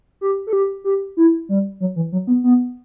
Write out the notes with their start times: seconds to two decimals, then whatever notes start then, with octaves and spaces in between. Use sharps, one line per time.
0.21 G4
0.47 A4
0.53 G4
0.84 G4
1.17 E4
1.49 G3
1.80 F#3
1.96 E3
2.12 F#3
2.27 B3
2.44 B3